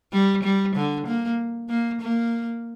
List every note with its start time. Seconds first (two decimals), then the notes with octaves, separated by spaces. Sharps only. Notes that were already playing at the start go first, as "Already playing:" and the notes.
0.13 G3
0.43 G3
0.76 D3
1.07 A#3
1.69 A#3
2.01 A#3